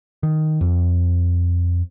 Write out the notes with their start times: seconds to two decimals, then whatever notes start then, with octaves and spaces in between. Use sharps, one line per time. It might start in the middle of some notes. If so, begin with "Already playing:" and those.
0.23 D#3
0.61 F2